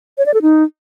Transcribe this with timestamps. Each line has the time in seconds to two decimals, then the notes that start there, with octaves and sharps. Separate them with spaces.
0.18 C#5
0.26 D5
0.34 A4
0.42 D#4